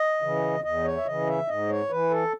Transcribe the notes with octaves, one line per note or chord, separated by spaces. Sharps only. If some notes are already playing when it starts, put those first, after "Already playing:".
Already playing: D#5
C#3 E3
E2 D#5
C#5
E5
C#3 E3 D#5
E5
G#2 D#5
C#5
E3 B4
A4